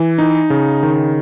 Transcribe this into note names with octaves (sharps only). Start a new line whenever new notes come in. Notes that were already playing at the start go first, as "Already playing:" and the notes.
Already playing: E3
D#4
C#3
D#3